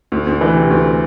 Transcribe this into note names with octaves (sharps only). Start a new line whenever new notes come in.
D2
D2
E3
C3
D2